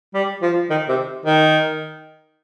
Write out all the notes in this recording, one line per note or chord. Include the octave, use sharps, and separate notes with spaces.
G3
F3
D#3
C3
D#3